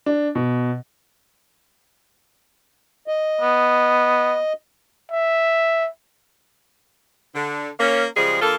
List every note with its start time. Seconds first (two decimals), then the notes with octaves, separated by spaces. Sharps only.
0.06 D4
0.35 B2
3.07 D#5
3.41 B3
5.11 E5
7.35 D3
7.80 A#3 C#4
8.16 C#3 F3 G3 G#3 G#4
8.41 D3 A#3 F4 A4